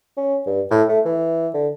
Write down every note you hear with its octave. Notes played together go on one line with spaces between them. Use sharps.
C#4
G2
A2
A3
E3
D3